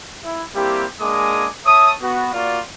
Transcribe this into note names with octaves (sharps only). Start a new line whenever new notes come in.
E4
G3 A#3 C4 E4 G4
G#3 A#3 D4 G#5 D6 D#6
C#5 E5 A5 D#6
B3 F#4
A#3 F4 F#4 D5